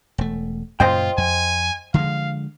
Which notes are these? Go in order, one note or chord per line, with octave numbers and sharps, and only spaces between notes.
E1 A3
F#2 A#2 C#3 F4 C5 D#5 G5
F2 G#5
D3 F3 G#3 F5